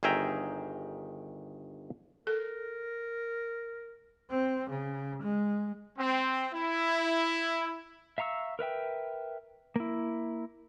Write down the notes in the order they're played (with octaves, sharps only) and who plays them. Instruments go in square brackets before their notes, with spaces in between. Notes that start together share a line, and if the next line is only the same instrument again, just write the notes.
[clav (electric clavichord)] G1 D#3 G#4 E5 G5 A#5
[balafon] A4 [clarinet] A#4
[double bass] C4
C#3
G#3
[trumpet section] C4
E4
[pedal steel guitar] E5 F5 A#5 C#6 E6
A#4 B4 E5 G5
A#3 E4